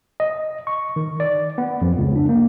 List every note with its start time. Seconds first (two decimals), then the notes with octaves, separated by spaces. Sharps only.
0.20 D#5
0.67 C#6
0.96 D#3
1.20 D5
1.58 B3
1.82 F2
1.98 C#2
2.16 D4
2.29 A#3